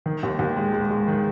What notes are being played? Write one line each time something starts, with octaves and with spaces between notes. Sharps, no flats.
D#3
D#2
D#2
G#3
G#3
G#3
D#3